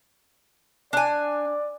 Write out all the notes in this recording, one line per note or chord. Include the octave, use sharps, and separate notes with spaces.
D4 D5 G#5